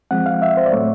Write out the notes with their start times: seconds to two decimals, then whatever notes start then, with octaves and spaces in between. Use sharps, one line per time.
0.11 F3 G#3 C4 F#5
0.26 F5
0.42 E5
0.57 C5
0.66 D5
0.73 A2 F#3 A3 C#5